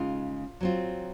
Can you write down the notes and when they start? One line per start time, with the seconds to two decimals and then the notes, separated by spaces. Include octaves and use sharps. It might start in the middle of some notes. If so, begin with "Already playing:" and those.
Already playing: C#3 G#3 D#4 F4
0.61 F#3 C4 F4